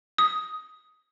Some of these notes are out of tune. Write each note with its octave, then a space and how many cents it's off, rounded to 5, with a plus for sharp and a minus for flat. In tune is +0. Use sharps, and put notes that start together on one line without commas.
D#6 +10